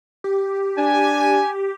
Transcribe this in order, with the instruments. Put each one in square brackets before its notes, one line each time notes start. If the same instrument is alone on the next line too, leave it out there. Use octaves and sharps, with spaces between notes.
[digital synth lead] G4
[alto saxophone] D4 [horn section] G#5